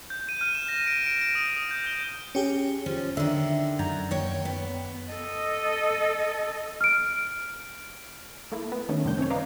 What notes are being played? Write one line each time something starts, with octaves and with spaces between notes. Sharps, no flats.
G6
D#7
F6
E7
A#6
D7
D7
D7
D#6
D#6
G6
G7
C#4 G4 G#4
F3 C#4
D3 D#3 E5
F#2 A#5
D#2 C#5 G5
B3
A4 D#5
F6 D7
A3 A#3 E4
B3
D#3 A3 C#4
F#2 C3 D#3 G3 D4 G6
C4 C#4 C#5
B4 D5 D#5 F5 A#5